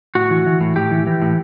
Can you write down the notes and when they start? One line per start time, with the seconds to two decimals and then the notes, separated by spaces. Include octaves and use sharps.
0.15 A2 F#4
0.31 E3
0.46 E3
0.61 A2
0.76 A2 G4
0.91 E3
1.07 E3
1.22 A2